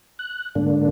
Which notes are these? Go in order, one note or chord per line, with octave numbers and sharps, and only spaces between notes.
F#6
G#2 D3 A#3 D4